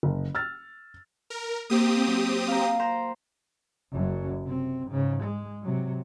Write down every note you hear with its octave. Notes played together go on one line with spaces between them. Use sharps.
F#1
E6 F6 A6
A#4
A#3 C4 G4 D#6
F#3
F5 A#5
C5 G5 A#5
F#1 F#2
C3 C4
G#2 C#3
G#3
C3 F#3